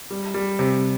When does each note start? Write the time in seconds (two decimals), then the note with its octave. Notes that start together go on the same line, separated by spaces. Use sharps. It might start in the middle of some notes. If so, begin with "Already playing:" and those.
0.10 G3
0.34 G3
0.59 C3